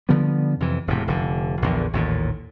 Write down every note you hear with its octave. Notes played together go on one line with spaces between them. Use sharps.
D3 F3 G3 B3
F2 C3 E3
E1 A2 C3
F1 D3
A#1 E2 D3
A1 D#2 A#2